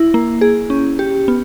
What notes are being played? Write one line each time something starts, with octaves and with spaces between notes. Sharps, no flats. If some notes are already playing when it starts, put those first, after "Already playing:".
Already playing: E4
A#3
G#4
C#4
G4
B3